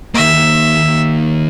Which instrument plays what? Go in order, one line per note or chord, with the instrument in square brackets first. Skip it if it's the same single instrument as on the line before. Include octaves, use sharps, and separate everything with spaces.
[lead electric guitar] D#3 A#3 [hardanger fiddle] E5